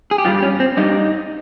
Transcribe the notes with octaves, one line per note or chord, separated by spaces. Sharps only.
G#4
G4
G2 G3 F4
C#4
C4
G2 G3 D#4